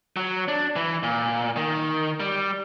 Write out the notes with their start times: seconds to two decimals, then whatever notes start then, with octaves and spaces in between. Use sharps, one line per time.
0.16 F#3
0.48 D4
0.76 E3
1.03 A#2
1.56 D#3
2.20 G3